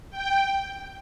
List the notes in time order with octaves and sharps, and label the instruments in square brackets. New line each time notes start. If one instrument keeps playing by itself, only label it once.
[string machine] G5